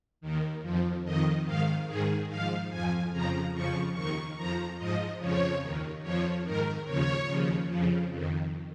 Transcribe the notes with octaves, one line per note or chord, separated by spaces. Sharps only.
D#2 D#3
F2 F3
F2 D#3 D#5
G#2 D#3 F5
G#2 D#3 G#4
G#2 F3 F5
F2 F3 G#5
F2 C#3 F3 A#5
F2 C#3 F3 C#6
D#2 D#3 C#6
F2 F3 A#5
G#2 F3 D#5
F2 C#3 F3 C#5
D#2 D#3
F2 F3 C#5
G#2 D#3 A#4
D#2 C#3 F3 C#5
D#2 C#3 F3
F2 C#3 F3
F2 D#3